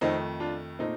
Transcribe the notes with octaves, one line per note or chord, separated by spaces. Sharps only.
F2 D#3 A3 C4 D#4
D4 F4
A#2 A3 C4 D#4